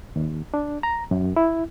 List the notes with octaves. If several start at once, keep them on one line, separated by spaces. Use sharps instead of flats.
D#2
D4
A#5
F#2
E4